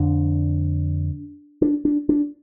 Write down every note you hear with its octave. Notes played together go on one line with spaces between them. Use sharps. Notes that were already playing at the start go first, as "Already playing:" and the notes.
Already playing: F2 D3 D4
D4
D4
D4